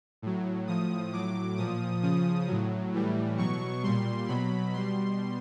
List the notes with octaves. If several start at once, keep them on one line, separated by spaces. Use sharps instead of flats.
A2 F#3
A2 F3 D#6
A2 F#3 D6
A#2 F3 D#6
C#3 F3 D#6
A2 F#3
A2 E3 G3
B2 F#3 C#6
A#2 G3 C6
B2 F#3 B5
B2 G3 C6